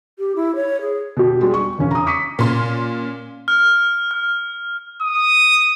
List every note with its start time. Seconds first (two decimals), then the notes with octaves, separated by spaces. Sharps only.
0.19 G4
0.36 E4
0.56 C#5
0.81 G#4
1.17 B2 G4
1.41 G3 G#3
1.54 C#6
1.78 E1 E2 C#3 C#4
1.91 A#5 D#6
2.06 C#6 D6 B6 C#7 D#7
2.39 A#2 C#4 C6
3.48 F6
4.11 F6
5.02 D#6